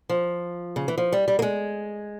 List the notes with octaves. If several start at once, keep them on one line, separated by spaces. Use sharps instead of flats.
F3
C#3
E3
F3
G3
G3
A#3
G#3